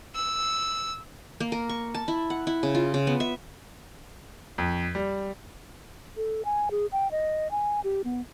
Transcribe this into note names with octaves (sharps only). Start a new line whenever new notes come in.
E6
A#3
A#4
C#6
A5
E4
F#5
E4
C#3
F4
C#3
B3
E5
F2
G3
A4
G#5
G#4
G5
D#5
G#5
G4
B3